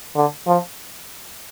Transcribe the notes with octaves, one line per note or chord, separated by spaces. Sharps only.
D3
F3